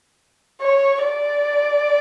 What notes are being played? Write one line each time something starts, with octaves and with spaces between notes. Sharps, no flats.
C#5
D5